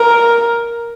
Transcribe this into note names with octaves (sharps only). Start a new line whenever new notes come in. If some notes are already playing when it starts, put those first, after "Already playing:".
Already playing: A#4